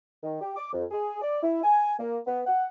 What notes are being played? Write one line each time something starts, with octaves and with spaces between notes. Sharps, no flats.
D#3
G4
D6
F2
G#4
D5
E4
G#5
A#3
B3
F#5